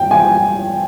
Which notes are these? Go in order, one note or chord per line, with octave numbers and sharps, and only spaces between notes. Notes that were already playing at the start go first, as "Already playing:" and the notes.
Already playing: G5
G#5